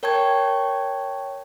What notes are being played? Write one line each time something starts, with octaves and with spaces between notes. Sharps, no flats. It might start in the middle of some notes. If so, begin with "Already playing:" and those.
A#4 C#5 G5 A5 C#6 G#6